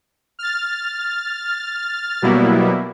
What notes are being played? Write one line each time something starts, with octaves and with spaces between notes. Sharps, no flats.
F6 A6
B2 F#3 G3 A#3 B3 E4